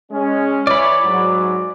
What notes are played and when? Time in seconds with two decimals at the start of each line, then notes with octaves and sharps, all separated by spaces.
0.11 G#3 C#4
0.67 E3 C#5 D5 B5
1.04 G#2 F#3